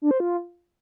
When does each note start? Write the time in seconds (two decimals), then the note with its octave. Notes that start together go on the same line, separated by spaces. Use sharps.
0.02 D4
0.11 C5
0.20 F4